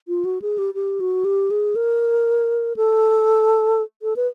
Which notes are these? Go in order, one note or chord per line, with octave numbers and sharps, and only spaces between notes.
F4
F#4
G#4
G4
G4
F#4
G4
G#4
A#4
A4
A4
B4